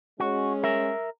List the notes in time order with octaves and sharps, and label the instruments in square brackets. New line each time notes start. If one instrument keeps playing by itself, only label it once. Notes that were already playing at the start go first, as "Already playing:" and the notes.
[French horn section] G#3 C#4 [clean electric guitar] F#4
[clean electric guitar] A#4 E5